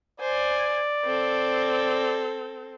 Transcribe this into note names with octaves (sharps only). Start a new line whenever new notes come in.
C5 D5 G#5
C4 A4